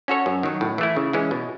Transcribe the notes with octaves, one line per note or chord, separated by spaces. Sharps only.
C#4 F#4 A4 C#5
F#2
D#3 F#3
A2
E3 A3 E4
C#3
E3 G#3 C#4
B2